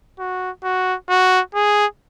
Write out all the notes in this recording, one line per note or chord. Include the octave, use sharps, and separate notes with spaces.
F#4
F#4
F#4
G#4